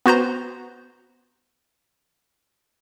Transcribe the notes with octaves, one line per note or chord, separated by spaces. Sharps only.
B3 F#4 C5 A#5